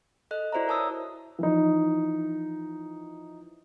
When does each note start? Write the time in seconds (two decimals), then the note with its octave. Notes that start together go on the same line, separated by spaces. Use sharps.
0.31 A4 D#5 F#6
0.52 E4 F#4 C5 D5 E5 A#5
0.67 A#4 C#5 A5 D#6 E6
1.39 E3 F3 D#4